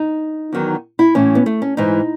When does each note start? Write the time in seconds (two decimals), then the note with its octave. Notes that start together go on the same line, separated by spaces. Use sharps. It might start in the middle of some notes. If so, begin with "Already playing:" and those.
Already playing: D#4
0.53 E2 D#3 F#3
0.99 E4
1.15 A2 E3 C#4
1.35 B3
1.46 A3
1.62 C#4
1.77 G#2 E3 D#4